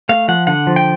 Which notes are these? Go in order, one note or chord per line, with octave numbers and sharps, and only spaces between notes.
A3 F5
F3 F#5
D3 F#5
F3
G5